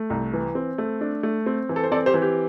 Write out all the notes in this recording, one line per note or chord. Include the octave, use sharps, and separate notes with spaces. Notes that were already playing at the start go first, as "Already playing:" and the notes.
Already playing: A3
C2
E3
C4
A3
D4
A3
C4
E3
A4
C5
C4 A4 D5
G4 C5
E3
G4